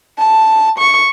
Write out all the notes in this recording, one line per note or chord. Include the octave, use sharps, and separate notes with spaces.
A5
C#6